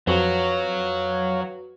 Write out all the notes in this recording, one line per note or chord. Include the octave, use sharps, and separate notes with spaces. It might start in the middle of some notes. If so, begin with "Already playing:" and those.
F2 F#3 F#4 B4 C#5 F5